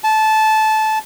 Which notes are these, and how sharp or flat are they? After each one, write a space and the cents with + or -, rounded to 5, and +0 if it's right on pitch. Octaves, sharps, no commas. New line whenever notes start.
A5 -15